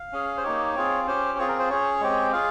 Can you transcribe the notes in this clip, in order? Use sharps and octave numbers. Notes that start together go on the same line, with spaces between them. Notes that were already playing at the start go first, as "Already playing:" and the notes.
Already playing: F5
C#4 G#4
C5
A#3 D#4 G4 C#5
C4 F4 G#4
C#4 G4 C5
C4 F4 G#4 C#5
A#4
C5
C#4 G#4 C#5
G#3 C4 G4
F4 G#4 F5